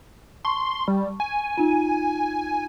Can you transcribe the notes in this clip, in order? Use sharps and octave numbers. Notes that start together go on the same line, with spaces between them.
A5 C6 C#6
G3
G#5
D#4 F4